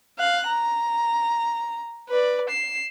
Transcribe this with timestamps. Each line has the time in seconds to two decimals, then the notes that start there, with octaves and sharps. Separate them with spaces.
0.18 F5 F#6
0.47 A#5
2.09 B4 D5
2.50 C7 E7